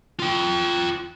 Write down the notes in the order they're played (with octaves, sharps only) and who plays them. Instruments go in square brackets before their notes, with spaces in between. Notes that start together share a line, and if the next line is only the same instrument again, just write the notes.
[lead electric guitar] F4 G5